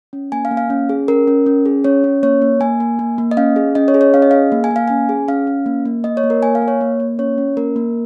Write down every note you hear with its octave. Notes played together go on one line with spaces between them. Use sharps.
C#4
A#3 G#5
F5
A#3
F5
C#4
G#4
C#4 A#4
C#4
C#4
G#4
C#4 C#5
C#4
A#3 C#5
A#3
A#3 G#5
A#3
A#3
A#3
D#5
C#4 F5
G#4
C#4 D#5
C#5
G#4
C#5
C#4 F5
D#5
G#4 F5
A#3
G#5
A#3
F5
C#4 G#5
G#4
C#4 F5
C#4
A#3
A#3
A#3 D#5
C#5
A#3
A#4
A#3 G#5
F5
A#3
C#5
A#3
A#3
C#4 C#5
C#4
A#3 A#4
A#3